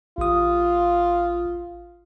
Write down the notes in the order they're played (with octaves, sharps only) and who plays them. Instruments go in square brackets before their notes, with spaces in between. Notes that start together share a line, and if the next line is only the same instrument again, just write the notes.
[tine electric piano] A1 D#6 [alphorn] F4